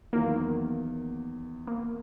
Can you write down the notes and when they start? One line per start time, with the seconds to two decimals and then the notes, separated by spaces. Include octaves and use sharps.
0.13 E2 D#3 F#3 A#3
1.67 A#3